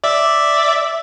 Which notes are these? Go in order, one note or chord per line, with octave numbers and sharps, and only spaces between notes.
D5 E5